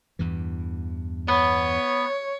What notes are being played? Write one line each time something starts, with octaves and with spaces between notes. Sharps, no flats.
E2 G2 E3
B3 C#5